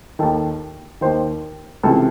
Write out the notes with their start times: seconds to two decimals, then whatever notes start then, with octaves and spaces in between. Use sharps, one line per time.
0.19 D#2 D#3 A4
1.01 D#2 D#3 C5
1.83 C#2 C3 E3 A4